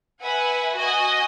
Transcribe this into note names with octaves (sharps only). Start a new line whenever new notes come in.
B4 E5 F#5 G#5
F#4 D#5 G#5